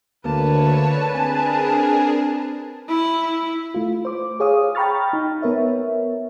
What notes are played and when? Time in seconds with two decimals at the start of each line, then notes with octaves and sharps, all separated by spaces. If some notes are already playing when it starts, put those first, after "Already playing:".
0.25 D2 D3 A#3 B4 C#5 A5
1.14 C4 D4 G#4 A#4 G#5
2.88 E4
3.74 A3 F4
4.05 C5 D6
4.40 G#4 C#5 F5 D#6
4.75 G5 A#5 B5 C#6 F6 A6
5.13 D#4
5.42 B3 A#4 C#5 E5